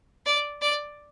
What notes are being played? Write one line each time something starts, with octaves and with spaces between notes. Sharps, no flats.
D5
D5